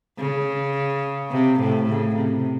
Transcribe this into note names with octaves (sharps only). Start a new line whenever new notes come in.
C#3
C3
A2
C#3
C3